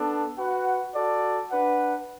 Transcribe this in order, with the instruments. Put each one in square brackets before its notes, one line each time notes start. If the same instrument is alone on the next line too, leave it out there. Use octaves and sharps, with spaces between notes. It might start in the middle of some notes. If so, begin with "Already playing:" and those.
Already playing: [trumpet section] B3 D4 A4
F#4 B4 F#5
F#4 A4 D5
D4 B4 F#5